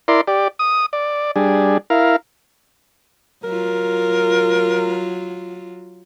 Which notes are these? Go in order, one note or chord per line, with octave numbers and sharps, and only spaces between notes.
E4 A#4 D5 C6
G4 D5
D#6
D5
G3 D4 G#4
E4 A#4 F5
F#3 F4 A#4